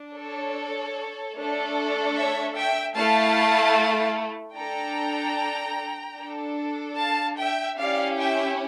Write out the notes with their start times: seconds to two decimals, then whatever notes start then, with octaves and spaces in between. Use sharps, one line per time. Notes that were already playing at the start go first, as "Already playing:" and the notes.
Already playing: D4
0.16 A4 C#5
1.36 A3 D4 A4
2.17 C#5 E5
2.57 E5 G5
2.97 A3 E4 A4 F5 A5
4.57 D4 A4 G5 A#5
6.18 D4 A4
6.98 F5 A5
7.38 E5 G5
7.78 C#4 E4 G4 D5 F5
8.18 E5 G5